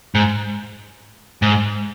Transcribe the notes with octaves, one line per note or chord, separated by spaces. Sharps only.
G#2
G#2